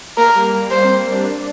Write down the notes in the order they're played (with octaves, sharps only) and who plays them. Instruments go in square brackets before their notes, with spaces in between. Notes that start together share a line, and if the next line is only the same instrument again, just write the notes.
[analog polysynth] A#3 [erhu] A#4
[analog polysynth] G3
G3
[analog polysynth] A#3 [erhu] C5
[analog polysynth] C4
C4
D4